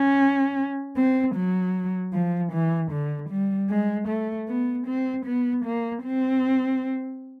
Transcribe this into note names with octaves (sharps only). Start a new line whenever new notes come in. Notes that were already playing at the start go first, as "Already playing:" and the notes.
Already playing: C#4
C4
F#3
F3
E3
D3
G3
G#3
A3
B3
C4
B3
A#3
C4